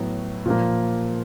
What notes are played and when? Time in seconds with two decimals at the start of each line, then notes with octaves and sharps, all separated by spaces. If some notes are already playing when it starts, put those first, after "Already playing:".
Already playing: A2 F#3 B3
0.46 A#2 F3 A#3